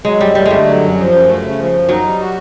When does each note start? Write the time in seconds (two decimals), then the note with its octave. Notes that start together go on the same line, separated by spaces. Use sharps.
0.04 F#3 G#3
0.20 F#2 G3
0.35 G3 A3
0.45 G#3
0.51 D3 G3
0.66 F#3
0.81 F#2
0.97 F3
1.12 F#2
1.27 A3
1.43 C#3
1.58 F3
1.73 F#2
1.88 F#3 D#4
2.03 G3
2.19 F#4